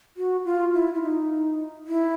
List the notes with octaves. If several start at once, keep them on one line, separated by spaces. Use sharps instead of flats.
F#4
F4
E4
E4
D#4
E4